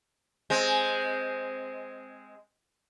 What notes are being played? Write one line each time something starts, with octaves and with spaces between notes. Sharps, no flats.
G#3 C4